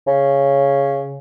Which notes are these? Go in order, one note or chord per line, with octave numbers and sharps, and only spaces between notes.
C#3